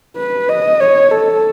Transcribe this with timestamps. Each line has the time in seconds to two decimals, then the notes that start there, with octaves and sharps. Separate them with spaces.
0.17 B4
0.49 D#5
0.81 C#5
1.12 A4